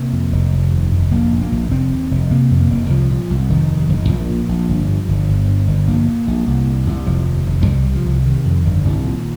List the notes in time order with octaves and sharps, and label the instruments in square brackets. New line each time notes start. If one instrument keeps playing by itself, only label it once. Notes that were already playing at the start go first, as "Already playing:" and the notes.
Already playing: [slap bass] C3 A#3
F2
F1
F1
D#2
F1
A#1 A#3
A#2
A#3
A#1
F1 C4
D#2
F1
C3 A#3
F2
A#3
F1
C2 F3
A#2
C2
F1 D#3
D#2
F1
A#1 F3
A#2
A#1
G1
G2
G1
G1
G2
G1
A#1 A#3
A#2
A#1
C2
A#2
C2
F1 F3
D#2
F1
F3
C2 G3
C3
F3
C2
C3 D#3
F2
G1
C2
A#2